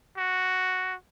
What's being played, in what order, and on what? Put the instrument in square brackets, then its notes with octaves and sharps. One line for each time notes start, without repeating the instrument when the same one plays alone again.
[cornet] F#4